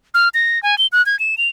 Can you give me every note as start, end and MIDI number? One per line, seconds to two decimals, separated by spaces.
0.14 0.29 89
0.34 0.61 94
0.63 0.78 80
0.78 0.87 103
0.92 1.04 90
1.06 1.18 92
1.19 1.38 100
1.38 1.48 101